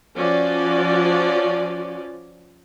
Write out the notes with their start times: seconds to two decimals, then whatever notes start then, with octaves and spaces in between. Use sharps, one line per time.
0.14 F3 C#4 F#4 D5